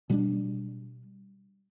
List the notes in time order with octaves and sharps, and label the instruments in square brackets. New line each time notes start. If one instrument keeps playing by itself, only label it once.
[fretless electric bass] B2 G3 B3 D4